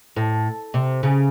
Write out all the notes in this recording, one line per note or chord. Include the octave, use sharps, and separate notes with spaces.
A2
C3
C#3